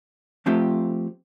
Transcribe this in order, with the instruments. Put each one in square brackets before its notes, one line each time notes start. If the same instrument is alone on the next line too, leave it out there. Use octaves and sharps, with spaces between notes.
[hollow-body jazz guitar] F3 A3 C4 F4 G4